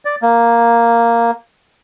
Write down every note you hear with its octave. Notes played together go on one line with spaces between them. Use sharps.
D5
A#3